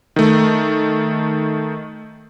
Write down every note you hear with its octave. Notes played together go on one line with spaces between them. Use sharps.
D#3 A3